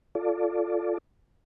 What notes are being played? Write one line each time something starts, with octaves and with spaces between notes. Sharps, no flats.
F4 A4 D5